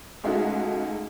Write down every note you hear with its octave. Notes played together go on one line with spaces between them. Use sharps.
C#2 G#3 A3 D#4 F#4